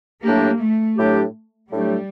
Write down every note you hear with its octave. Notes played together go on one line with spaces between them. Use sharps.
A2 F#3 A3 A#3 D4 G4
A3
A2 F#3 A3 D4 G4
A2 F#3 G3 A3 D4 G4